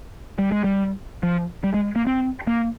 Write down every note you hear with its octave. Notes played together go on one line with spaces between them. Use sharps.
G3
G#3
G3
F3
G3
G#3
A#3
C4
A#3